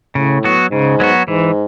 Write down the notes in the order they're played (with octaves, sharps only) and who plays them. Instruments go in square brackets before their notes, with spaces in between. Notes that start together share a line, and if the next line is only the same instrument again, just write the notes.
[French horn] A2 [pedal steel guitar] C#3
[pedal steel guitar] F#3 B3 F#4
[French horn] G#2 [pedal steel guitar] C#3
[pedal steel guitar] F#3 B3 F#4
[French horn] G#2 [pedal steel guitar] E3